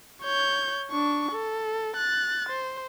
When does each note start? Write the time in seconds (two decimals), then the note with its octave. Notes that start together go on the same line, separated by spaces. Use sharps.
0.23 C#5 G6
0.91 D4 C#6
1.33 A4
1.96 F#6 A6
2.49 C5